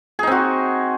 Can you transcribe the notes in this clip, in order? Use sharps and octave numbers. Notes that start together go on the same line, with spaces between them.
C4 D#4 F#4 G#4